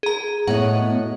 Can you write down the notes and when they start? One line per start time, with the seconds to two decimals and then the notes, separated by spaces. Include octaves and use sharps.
0.03 G#4 A#5
0.47 A2 B3 F#4 C#5 D#5 F#5